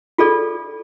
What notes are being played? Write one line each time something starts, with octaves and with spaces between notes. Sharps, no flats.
F4 G#4 A4 D5